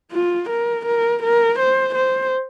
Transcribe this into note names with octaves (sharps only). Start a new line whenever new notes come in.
F4
A#4
A#4
A#4
C5
C5